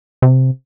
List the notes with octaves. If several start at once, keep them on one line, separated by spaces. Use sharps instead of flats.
C3